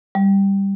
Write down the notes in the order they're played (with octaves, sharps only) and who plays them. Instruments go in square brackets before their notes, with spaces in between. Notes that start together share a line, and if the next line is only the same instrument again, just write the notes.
[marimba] G3